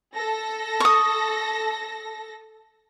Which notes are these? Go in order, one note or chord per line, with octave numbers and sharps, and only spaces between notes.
A4 A#6
C#6 D#6